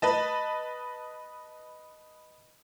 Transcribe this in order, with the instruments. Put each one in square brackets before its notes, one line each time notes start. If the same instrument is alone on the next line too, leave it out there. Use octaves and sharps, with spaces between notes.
[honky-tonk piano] B4 D#5 A5